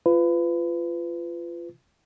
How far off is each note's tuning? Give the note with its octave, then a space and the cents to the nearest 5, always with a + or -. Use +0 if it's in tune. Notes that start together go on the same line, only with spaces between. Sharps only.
F4 -20 B4 +25